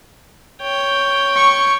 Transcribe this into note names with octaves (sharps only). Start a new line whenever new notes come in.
C#5 G5
C#6